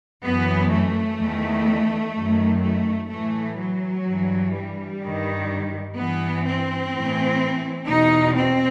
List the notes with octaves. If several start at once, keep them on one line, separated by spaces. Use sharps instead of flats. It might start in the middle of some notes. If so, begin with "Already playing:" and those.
F#2 E3 B3
A3
E2 D#3
F#2 D#3
A3
A2 E3 A3
F#3
G2 E3
G3
G2 D#3
G2 E3 B3
C4
A2 E3
E2 B2 D#4
C4